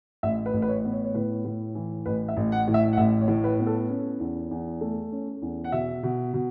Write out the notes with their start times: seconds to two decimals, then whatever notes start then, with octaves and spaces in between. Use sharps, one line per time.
0.23 A1 E5
0.46 B4
0.54 A1
0.62 B4
0.68 C#5
0.84 B3
0.92 C#5
1.04 C#5
1.15 A2 B4
1.45 A2
1.75 E3
2.06 A1 B4
2.28 E5
2.37 A1
2.52 F#5
2.68 A2
2.74 E5
2.93 F#5
2.97 A1 E5
3.21 C#5
3.28 A2
3.44 B4
3.59 B3
3.67 A4
3.89 C#4
4.20 E2
4.51 E2
4.81 A3
5.11 C#4
5.42 E2
5.64 F#5
5.72 B2 E5
6.03 B2
6.33 B2